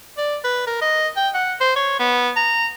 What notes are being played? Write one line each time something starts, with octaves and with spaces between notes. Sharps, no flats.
D5
B4
A#4
D#5
G5
F#5
C5
C#5
B3
A#5